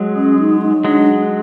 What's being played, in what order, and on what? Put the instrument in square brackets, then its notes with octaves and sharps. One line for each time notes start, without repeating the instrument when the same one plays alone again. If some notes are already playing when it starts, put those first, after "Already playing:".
Already playing: [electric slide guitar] F#3 G#3
[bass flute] C#4
D#4
D#4
[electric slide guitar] F#3 G#3 [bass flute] D4